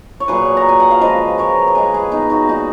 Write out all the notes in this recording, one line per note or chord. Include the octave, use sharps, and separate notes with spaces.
C#5
A#2 F#3 G#4 B4
A#5
G#5
F#5
F5
C#3 F3 G#3 B4 D#5
A#4 C#5
C#5
C#3 G#3 G#4 B4
G#4 B4
B3 D#4
D#4 F#4
A#2 G#3 D#4 F#4